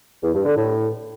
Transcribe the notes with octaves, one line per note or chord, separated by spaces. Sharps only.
E2
G2
D3
A2